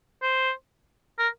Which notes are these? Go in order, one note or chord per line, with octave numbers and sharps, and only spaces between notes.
C5
A#4